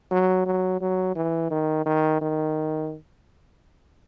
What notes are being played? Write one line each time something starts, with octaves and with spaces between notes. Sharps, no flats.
F#3
F#3
F#3
E3
D#3
D#3
D#3